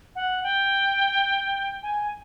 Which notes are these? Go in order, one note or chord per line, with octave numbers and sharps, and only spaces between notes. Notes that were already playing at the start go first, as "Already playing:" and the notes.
F#5
G5
G#5